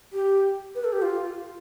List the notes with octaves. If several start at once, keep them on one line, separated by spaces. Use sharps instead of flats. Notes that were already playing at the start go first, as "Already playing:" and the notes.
G4
B4
A4
G4
F4